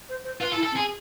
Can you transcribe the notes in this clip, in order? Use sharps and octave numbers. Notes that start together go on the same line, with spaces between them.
C5
C5
F4 B4
A4
E4
A4
C4
G#4